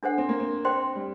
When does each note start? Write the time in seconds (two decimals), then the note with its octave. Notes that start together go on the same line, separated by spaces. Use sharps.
0.03 D4 A4 C5 F#5
0.18 C4
0.29 A#3
0.40 C4
0.65 C5 G5 C6
0.96 G3